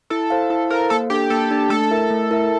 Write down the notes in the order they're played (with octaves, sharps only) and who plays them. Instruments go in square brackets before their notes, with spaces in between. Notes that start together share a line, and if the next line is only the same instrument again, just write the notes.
[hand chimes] E4 [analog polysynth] A4
[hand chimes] A4 C5 F5
[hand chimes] E4 [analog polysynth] A4
[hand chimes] A4 C5 F5 [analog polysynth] A#4
[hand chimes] A#3 [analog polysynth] A4
[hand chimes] D4 A4 [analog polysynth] G4
[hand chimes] A#3 [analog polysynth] A4
[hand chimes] D4 A4
[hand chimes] A3 [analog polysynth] A4
[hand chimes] E4 A#4 E5
A3
E4 A#4 E5